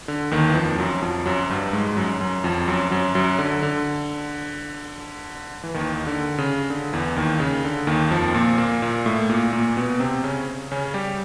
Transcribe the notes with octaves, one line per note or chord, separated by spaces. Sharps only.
D3
D#2 D#3
E3
F2 F3
F#2 F#3
F2 F3
F#2 F#3
G2 G3
G#2 G#3
F#2 F#3
F#2 F#3
F2 F3
F#2 F#3
F#2 F#3
F#2 F#3
D3
D3
E3
D#2 D#3
D3
C#3
D3
E2 E3
D#2 D#3
C#3
D3
D#2 D#3
F2 F3
A#2 A#3
A#2 A#3
A#2 A#3
A2 A3
A#2 A#3
A#2 A#3
B2 B3
C3 C4
C#3 C#4
C#3 C#4
G3 G4